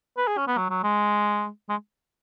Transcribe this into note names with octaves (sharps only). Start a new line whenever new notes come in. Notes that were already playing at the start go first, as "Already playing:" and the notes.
B4
G#4
C#4
B3
F#3
F#3
G#3
G#3